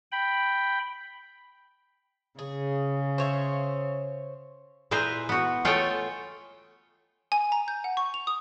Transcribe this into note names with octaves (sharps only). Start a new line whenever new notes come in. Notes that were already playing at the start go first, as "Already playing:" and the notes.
G5 B5
C#3 G#4
C5 C#5 E5
A#2 E4 G#4 B4 C5 A#5
B3 F#4
A3 F4 G#4 A4 C#5 G5
G#5
A#5
G6
F#5
C#6
F7
D#6